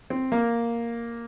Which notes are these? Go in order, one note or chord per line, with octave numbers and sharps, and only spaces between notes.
C4
A#3